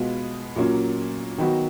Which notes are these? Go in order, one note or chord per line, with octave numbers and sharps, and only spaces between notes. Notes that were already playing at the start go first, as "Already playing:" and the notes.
Already playing: B2 G#3 B3 F4
A#2 F#3 A#3 C#4
D#3 F#3 B3 F#4